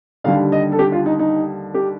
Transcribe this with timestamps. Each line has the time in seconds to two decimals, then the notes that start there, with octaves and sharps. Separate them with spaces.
0.24 D#2 D3 G3 F5
0.52 D#5
0.72 A4
0.79 G4
0.92 F4
1.06 D#4
1.19 D#4
1.74 G4